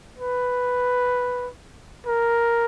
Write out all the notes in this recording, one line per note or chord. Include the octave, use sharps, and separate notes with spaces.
B4
A#4